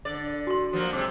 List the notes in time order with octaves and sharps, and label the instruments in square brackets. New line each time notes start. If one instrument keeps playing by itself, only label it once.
[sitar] D3 D5
[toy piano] F#4 C6
[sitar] F3 F#3 A#3
[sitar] C3 G#3 [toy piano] D6